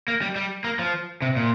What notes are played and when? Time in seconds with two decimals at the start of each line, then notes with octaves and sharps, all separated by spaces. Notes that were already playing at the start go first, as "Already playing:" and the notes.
0.08 A#3
0.21 G3
0.36 G3
0.64 A#3
0.79 F3
1.22 C3
1.36 A#2